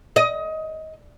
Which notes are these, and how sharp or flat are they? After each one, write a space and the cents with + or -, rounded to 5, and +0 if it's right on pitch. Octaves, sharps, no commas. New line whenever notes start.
D#5 +20